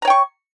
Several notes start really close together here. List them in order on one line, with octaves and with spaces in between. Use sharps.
A#5 C#5 G5 C#6